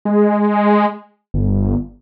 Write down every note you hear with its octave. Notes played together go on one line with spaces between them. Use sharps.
G#3
G1